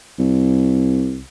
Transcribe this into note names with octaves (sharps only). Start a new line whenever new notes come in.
C2